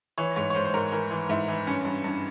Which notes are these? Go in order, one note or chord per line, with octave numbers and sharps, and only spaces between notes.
E3 C#5
G#2 C#5
C#5
G#2 C5
C5
G#2 A#4
E3 A#4
E3
G#2 E4
E3
G2 C#4
G2
G2